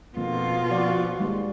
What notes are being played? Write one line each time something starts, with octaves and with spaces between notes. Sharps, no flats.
F2 B2 D3 A#3 F4
F3 F#4 D5
D#2 G3 G#3